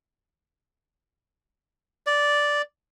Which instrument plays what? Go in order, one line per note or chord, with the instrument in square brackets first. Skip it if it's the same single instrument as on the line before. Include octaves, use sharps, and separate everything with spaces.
[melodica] D5